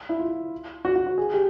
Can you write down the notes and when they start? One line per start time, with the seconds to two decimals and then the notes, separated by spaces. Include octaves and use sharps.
0.09 E4
0.20 F4
0.85 F#4
0.96 F#4
1.07 F#4
1.18 G#4
1.34 G4